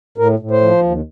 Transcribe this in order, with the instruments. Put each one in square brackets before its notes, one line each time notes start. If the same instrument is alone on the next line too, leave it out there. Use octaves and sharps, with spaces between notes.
[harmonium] A2 A#4
A2
C5
F3
D#2